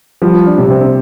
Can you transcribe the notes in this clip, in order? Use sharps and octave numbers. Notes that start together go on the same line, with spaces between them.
F3 G3
D4
C3
C4